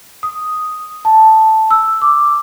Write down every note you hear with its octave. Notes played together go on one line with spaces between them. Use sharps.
D#6
A5
E6
D6